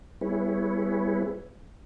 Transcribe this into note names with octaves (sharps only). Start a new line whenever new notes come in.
G3 B3 E4 G#4 B4 C#5